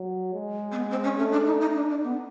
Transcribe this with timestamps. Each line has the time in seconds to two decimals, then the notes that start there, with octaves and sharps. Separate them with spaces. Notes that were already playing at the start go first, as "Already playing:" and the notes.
Already playing: F#3
0.34 G#3
0.71 C4
0.76 B3
0.90 C4
1.03 C#4
1.18 A3 C#4
1.32 D4
1.46 D#4
1.60 D#4
1.75 D4
1.89 D4
2.03 B3